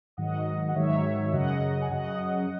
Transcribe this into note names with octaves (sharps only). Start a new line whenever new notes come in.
G#2 D#3 F#3 D#5 F#5
F#5
G#2 D#3 F#3 C#5 E5
F#2 C#3 F#3 D#5 F#5
G#5
F#2 C#3 F#3 D#5 F#5